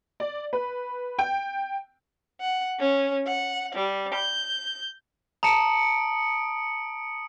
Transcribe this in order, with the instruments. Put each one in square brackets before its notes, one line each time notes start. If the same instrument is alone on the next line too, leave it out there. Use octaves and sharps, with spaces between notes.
[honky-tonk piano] D5
B4
G5
[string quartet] F#5
C#4
F#5
G3
G6
[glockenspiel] A5 A#5 [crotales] D#6 C#7 D7